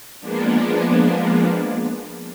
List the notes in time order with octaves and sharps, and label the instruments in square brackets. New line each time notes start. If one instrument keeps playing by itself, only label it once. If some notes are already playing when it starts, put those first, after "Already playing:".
[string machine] F3 G#3 A#3 B3 D4